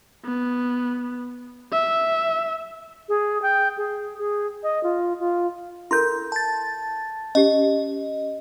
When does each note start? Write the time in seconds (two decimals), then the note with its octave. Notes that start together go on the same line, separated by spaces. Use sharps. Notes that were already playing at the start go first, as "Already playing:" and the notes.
0.25 B3
1.72 E5
3.09 G#4
3.42 G5
3.77 G#4
4.18 G#4
4.63 D#5
4.83 F4
5.20 F4
5.91 E4 A4 A#4 C6 G6
6.32 A5 A6
7.35 C#4 G4 D#5